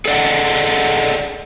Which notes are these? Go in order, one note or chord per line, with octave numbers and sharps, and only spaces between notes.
G#4 A4 D5 D#5 F#5